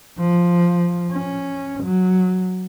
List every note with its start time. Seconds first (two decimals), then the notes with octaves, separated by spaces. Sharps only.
0.19 F3
1.12 C#4
1.83 F#3